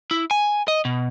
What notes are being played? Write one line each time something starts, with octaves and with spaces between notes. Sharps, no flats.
E4
G#5
D#5
B2